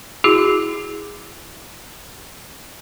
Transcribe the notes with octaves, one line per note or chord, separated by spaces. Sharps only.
E4 F#4 G#4